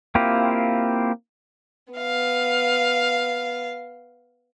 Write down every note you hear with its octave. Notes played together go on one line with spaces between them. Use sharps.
A#3 C4 E4 F4 G4
B3 F5